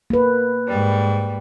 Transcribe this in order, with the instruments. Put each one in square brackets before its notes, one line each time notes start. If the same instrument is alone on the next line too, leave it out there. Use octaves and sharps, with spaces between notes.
[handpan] A#3 B4
[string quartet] G#2 G3